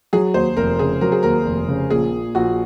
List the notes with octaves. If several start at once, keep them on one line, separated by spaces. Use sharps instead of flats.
F#3 G#4
D#2 C5
F1 A#4
C#3 G#4
F#3 A#4
G#4
D#2 A#4
F1
C#3
A#1 G#4
A#2
A#1 F#4